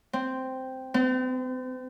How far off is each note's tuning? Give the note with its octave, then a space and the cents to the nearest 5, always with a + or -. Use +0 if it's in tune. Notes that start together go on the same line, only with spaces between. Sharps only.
C4 -5
C4 -45